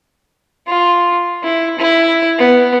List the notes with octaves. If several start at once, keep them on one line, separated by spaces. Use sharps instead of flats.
F4
E4
E4
B3